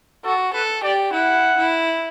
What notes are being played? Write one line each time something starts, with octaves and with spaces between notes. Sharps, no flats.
F#4 A4
A4 B4
G4 D5
E4 F#5
E4